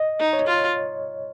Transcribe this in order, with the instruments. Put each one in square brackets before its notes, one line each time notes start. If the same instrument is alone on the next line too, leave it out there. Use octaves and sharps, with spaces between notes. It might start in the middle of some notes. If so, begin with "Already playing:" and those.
Already playing: [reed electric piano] D#5
[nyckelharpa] D#4
[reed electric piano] C#5
[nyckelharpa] F4